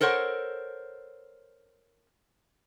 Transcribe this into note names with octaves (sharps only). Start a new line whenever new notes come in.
A4 A#4 C5 C#5 F#5